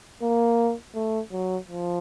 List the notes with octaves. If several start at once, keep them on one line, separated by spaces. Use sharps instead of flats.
A#3
A3
F#3
F3